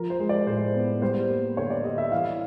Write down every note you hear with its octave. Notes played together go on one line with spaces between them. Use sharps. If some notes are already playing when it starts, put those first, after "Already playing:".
Already playing: F3 A#4
C5
G#3
D5
A2 C5
B3
G3 C5
A#3
D3 C#5
D5
D3 D#5
E5
E3 F5